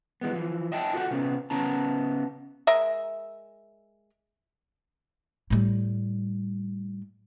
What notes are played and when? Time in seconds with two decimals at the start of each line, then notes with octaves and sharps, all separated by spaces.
0.21 E3 G#3 B3
0.33 E3 F3
0.72 D#5 E5 G5 A5
0.93 F4 F#4 A4 F#5
1.11 C3 B3 C#4
1.50 C#3 B3 C#4 A5 A#5
2.67 G#3 A#4 E5
5.50 A2 G3